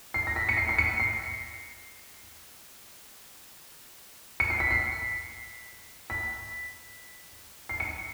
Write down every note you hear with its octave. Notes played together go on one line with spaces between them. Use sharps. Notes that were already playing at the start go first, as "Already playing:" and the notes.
C7
A#6
B6
C#7
C7
C7
C#7
C7
C#7
C7
B6
C7
B6
C7
C#7